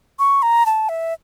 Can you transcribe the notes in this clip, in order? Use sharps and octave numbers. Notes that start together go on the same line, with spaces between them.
C#6
A#5
A5
E5